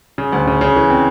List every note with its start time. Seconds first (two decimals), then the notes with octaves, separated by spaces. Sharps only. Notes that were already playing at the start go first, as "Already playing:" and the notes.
0.18 C#3
0.33 D2
0.47 C#3
0.61 C#3
0.76 E3
0.90 C4